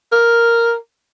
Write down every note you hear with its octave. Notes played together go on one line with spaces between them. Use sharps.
A#4